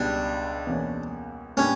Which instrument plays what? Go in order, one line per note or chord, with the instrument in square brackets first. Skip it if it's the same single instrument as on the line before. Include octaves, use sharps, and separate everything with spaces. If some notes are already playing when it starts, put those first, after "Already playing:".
Already playing: [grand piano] C#2 B2 G3 B3 [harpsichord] D4
[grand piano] E2 B2 A#3 C#4
[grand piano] A#2 G3 B3 D4 G4 [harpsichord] C#4